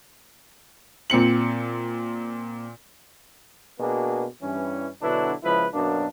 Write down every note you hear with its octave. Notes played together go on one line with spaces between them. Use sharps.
A#2 C4 C#7 F#7
B2 A#3 B3 D4 F#4 G#4
G2 E3 C#4
B2 D3 F#3 D4 E4 B4
C#2 F3 E4 B4
F#2 B2 A#3 D4